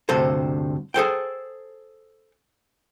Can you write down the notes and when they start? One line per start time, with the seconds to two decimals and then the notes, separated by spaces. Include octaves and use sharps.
0.09 D2 G2 C3 A4 C5
0.94 G#4 A4 C5 G5